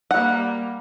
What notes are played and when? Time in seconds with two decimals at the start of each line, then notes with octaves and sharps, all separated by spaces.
0.11 G3 A#3 F#5